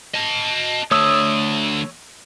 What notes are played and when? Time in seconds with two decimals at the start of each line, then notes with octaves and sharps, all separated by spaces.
0.14 D#5 A5
0.91 D3 A3 C#5 D#6 E6